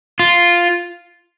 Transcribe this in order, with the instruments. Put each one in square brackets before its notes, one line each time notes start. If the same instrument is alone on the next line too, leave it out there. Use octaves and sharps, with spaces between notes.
[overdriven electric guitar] F4